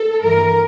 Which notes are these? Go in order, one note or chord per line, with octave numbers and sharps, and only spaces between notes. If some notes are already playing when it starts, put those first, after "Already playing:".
Already playing: A4
G2 E3 A#4